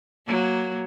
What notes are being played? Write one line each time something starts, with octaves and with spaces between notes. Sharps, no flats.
F#3 A#3